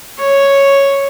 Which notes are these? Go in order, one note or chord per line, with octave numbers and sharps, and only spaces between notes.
C#5